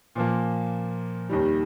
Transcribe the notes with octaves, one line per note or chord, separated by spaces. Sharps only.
A#2 F3 A#3
D#2 D#3 G3